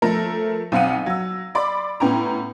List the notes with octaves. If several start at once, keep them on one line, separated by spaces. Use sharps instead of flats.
F3 A3 A4 A#4
B1 C4 F5 F#5 D#7
F#3 E6
D5 B5 C6 D6
A2 B3 C#4 G5 A#5